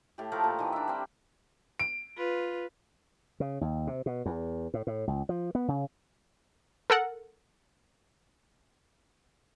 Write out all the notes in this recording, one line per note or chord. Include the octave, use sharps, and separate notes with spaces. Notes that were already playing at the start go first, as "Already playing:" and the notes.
A2 G4
F3 A3 A#4 D6
A#2
D#3 E3
D4 E5
G3 C4
D7
F4 B4
C#3
D#2
C3
B2
E2
A2
A2
C#2
F3
B3
C#3
A4 A#4 F#5